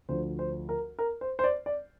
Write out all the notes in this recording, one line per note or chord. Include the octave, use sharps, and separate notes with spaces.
D2 D3 F3 C5
C5
A#4
A#4
C5
C5
D5
D5